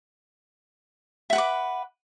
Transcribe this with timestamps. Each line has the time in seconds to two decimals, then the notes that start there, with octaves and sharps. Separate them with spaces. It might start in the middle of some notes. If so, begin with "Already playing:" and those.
1.30 E5
1.33 F#5
1.35 B4
1.38 D6